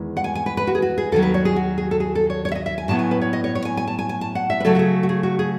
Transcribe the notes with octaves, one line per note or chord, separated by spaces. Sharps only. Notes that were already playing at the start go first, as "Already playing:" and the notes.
Already playing: E2 D#3 G#3
F#5
G#5
G#5
B4
B4
F#4
G#4
F#4
G#4
D#2 D#3 F#3 A4
B4
C#5
G#4
F#4
G#4
A4
G#4
A4
C#5
C#5
E5
D#5
E5
G#5
A2 F#3 B3 A5
G#5
B4
C#5
D#5
C#5
C#5
G#5
G#5
A5
G#5
G#5
A5
F#5
E5
B4
C#3 F#3 A3 A4
F#4
G#4
F#4
G#4
F#4
G#4